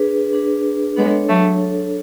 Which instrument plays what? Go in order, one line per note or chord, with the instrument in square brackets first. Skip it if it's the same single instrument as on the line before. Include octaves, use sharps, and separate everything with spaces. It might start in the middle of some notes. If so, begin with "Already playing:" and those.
Already playing: [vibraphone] D4 G#4 B4
D4 G#4 B4
[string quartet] G#3 B3 [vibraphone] D4 A4 C#5
[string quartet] F#3 A3
[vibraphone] D4 A4 C#5